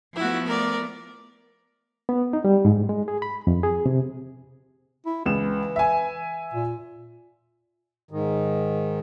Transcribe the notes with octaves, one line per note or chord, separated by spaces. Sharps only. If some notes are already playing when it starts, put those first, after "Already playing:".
F3 A3 B3 E4 F#4
A#4 D5
B3
D#4
G3
G#2
G#3
G#4
B5
F2
G#4
C3
E4
C#2 E3 E7
E5 G#5
A#2
G#2 D#3